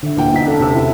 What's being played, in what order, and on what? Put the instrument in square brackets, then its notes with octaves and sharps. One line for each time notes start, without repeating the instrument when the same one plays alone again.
[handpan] D3 E5
[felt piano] D#1 E3 G5
B1 D#4 B6
[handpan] C#4 A4 F5 [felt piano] D4
[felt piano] E1 C3 E6
[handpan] C#4 E4